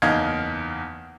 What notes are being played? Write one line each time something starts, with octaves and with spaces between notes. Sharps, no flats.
F#1 E2 D#4 F5 G#6